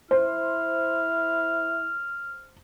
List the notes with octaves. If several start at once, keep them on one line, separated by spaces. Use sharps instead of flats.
E4 C5 F6